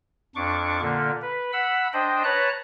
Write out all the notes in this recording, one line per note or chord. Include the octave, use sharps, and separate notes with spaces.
F2 D4 C#6 D6
A#2 D3 A#3
B4
F#5 B5 E6
D4 C5 D#5 G5
B4 C#5 A5 A#5 F#6